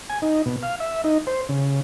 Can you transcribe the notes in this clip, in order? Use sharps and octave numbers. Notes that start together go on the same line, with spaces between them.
G#5
D#4
B2
F5
E5
D#4
C5
C#3